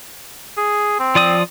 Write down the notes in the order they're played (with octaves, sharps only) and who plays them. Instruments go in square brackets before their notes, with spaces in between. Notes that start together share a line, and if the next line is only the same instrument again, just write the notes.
[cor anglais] G#4
C4
[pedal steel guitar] F3 D5 D#6